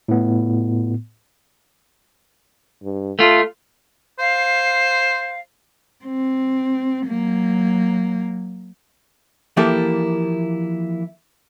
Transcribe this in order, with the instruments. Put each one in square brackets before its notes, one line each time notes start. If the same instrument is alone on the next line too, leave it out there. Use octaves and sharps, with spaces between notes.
[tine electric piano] A2 B3
[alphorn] G2
[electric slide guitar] A3 F4 [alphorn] A4
[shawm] C5 [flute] F5
[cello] C4
F#3 A#3
[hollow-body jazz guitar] E3 F3 A#3 E4 G4 A4